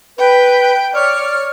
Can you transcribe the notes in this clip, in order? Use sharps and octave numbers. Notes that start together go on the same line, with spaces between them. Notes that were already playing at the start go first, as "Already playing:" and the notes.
B4 G5
C#5 D5 F6